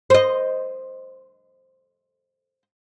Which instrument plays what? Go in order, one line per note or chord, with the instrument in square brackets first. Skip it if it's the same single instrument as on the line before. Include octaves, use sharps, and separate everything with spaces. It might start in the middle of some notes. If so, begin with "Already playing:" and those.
[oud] C5 D#5